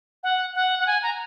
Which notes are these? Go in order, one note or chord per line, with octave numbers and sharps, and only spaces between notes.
F#5
F#5
F#5
G#5
A#5